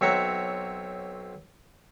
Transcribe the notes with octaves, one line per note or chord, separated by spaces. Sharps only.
B1 C4 C#5 E5 F#5 A#5